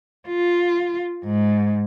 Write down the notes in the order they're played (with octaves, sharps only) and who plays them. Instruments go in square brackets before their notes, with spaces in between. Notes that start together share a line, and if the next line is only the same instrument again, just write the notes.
[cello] F4
G#2